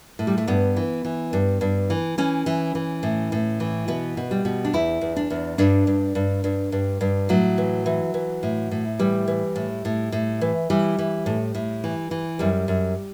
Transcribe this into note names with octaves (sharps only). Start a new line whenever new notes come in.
A2
G3
A3
G2 B3
E3
E3
G2
G2
E3
E3 C#4
E3
E3
A2
A2
E3
B2 B3
B2
G3
B2
D4
E2 E4
E2
D4
E2
G2 D4
G2
G2
G2
G2
G2
A2 F#3
E3
E3
E3
A2
A2
E3 G3
E3
A2
A2
A2
E3
E3 G3
E3
A2
A2
E3
E3
F#2 G3
F#2